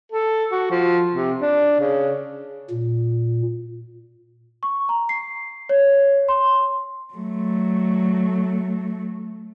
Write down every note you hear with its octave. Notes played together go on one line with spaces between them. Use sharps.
A4
F#4
F3
C3
D4
C#3
A#2
C#6
A#5
C7
C#5
C6
F#3 A3